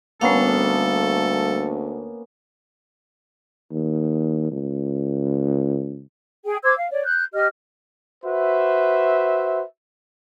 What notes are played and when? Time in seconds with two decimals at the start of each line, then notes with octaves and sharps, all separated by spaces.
0.21 D2 G3 A#3 B3 C#4 A4 F5
3.71 D#2
4.52 C#2
6.45 G#4 G5
6.64 C5 D6 E6 G#6
6.77 F5
6.91 C#5 D5
7.04 F#6 G6
7.33 G4 D#5 F6
8.24 F#4 B4 C5 E5